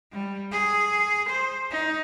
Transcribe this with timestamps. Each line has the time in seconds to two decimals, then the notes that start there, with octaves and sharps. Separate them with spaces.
0.12 G3
0.52 G#4
1.29 C5
1.71 D#4